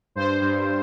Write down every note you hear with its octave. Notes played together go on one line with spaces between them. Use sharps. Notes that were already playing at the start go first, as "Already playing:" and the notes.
G2 C5
G2